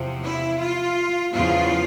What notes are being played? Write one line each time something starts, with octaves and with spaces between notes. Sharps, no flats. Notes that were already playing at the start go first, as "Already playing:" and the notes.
Already playing: E2 C3 F3
E4
F4
E2 C#3 F3 F4